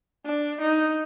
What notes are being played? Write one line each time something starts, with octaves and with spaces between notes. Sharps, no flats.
D4
D#4